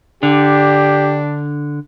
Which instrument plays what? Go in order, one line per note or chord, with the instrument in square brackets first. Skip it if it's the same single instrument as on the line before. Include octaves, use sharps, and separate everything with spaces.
[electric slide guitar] D3 [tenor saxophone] D4 [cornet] G4